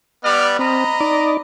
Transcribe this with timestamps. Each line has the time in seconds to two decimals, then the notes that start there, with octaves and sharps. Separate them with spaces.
0.24 G3 B3 D5 F6
0.59 C4 D#5 A#5 B5
1.00 D#4 D5